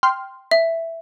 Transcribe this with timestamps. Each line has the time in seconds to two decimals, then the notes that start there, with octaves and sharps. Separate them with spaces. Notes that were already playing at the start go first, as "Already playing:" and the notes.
0.03 G5 C6 F6
0.51 E5